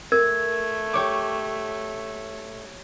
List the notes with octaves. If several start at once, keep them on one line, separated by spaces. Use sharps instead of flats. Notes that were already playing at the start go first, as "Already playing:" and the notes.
A3 A#4 G#6
G4 C#5 D6